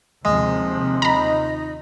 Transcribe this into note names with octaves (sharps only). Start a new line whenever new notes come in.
D#2 C3 F3 G#3
D#4 D#5 A#5 B5